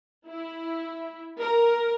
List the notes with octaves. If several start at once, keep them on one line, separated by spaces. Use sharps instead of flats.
E4
A#4